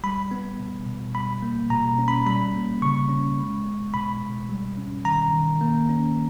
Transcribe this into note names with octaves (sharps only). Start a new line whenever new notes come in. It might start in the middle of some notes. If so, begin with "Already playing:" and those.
G3 B5
B3
B2
B2
G3 B5
A#3
B2 A#5
C#4
B5
G3 B5
A#3
C#3 C#6
C#4
G#3
B3
B2 B5
B2
G3
C#4
D#3 A#5
D#3
A#3
C#4